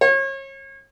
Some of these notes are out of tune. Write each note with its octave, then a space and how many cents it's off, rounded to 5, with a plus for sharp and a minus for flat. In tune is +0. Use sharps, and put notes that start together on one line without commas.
C#5 -35